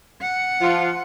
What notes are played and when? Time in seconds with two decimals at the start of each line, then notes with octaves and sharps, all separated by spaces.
0.22 F#5
0.60 F3 F4